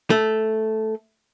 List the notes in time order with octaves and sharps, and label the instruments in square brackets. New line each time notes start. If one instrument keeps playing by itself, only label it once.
[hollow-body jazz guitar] A3